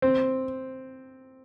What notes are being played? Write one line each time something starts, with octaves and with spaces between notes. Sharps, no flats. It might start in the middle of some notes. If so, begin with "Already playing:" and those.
C4